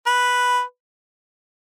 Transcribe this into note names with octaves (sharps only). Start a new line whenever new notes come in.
B4